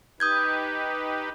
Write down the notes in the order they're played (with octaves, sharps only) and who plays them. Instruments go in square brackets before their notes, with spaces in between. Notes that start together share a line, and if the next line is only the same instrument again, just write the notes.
[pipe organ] D#4 G4 B4 [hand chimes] D#6 G6 G#6